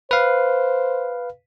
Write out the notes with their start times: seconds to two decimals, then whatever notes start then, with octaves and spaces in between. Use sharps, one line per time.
0.11 B4 C5 F5